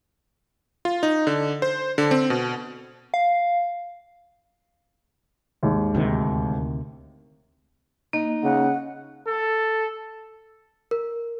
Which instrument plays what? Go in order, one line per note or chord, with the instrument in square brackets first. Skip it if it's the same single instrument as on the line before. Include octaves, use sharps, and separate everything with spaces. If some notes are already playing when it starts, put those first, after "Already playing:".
[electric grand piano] F4
D#4
D3
C5
D3
C4
B2
[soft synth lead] F5
[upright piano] D#2 G#2
[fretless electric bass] D2 C3 D#3
[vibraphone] A#3 [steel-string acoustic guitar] D#4
[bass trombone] C#3 [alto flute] F#5
[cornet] A4
[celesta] A#4